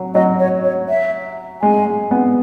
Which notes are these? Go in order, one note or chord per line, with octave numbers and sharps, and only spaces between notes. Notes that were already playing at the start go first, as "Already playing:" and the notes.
Already playing: F#3
F#3 D#5
C#5
C#5
E5
G#3 G#5
G#3
B3